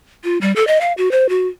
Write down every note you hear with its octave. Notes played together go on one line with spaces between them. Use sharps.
F4
G3
A4
D#5
F5
F#4
C5
F#4